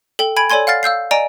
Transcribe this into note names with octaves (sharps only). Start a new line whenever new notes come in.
A4 G5 G7
G#5 B5 G#6 D7
A4 C#5 D5 G#5 C6 G#6
F5 F#5 F6 A6 C7
F5 E6 G6 C7
D5 D#5 G#5 A#5 D7